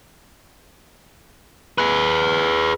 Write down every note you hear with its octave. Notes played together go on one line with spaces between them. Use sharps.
G#4 B4